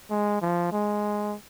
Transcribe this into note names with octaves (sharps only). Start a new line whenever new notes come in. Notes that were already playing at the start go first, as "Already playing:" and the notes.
G#3
F3
G#3